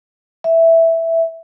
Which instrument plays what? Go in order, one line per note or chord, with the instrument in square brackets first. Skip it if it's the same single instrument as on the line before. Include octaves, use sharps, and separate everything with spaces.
[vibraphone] E5